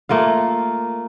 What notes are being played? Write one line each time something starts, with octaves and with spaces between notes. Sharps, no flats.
A3 A#3 F4 F5